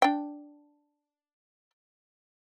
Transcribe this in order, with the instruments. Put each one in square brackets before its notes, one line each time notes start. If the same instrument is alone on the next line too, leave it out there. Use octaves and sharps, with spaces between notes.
[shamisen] D4 G5